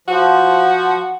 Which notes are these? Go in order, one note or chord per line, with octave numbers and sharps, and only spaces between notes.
F3 F#4